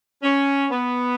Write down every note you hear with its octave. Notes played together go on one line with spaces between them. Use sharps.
C#4
B3